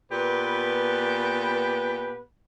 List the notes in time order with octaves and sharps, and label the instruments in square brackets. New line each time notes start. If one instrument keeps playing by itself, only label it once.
[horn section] A#2 B3 G4 B4